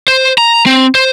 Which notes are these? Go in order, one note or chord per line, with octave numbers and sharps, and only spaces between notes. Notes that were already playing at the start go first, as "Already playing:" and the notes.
C5
A#5
C4
C5